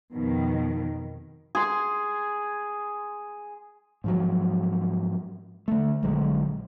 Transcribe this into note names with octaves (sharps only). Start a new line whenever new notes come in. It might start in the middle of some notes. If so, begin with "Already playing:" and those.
F2 B2 D#3
G#4 C6
G#2 F3 F#3
D3 A3
A#1 D3 F#3 G#3